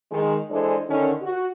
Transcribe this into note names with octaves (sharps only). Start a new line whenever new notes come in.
D#3 G#3
E3 G#3 D4 A4 C5 D5
D3 D#3 C#4
F#4